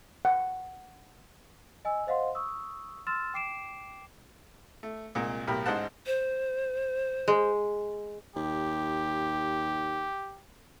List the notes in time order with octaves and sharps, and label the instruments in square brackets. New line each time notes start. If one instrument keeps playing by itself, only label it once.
[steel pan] F#5
[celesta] D#5 G#5 E6
C5 D#5 F5 F#5 C6
C#6 D#6 E6
C6 E6 F6 A6 E7
G5 D6 C7 D7 E7
[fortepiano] A3
C2 A#2 G#3
B1 A2 G4 A#4 B5
A1 G#3 D#4 C5 F#5 A5
[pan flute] C5
[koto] G#3
[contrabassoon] D#2 [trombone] G4